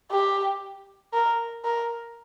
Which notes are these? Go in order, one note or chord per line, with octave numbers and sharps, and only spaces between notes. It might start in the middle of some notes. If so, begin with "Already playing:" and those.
G4
A#4
A#4